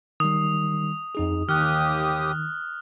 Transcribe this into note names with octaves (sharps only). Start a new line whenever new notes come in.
D#3 G3 D#6
F2 D#4 G#4
D#2 D#3 G4 D#6 F6 F#6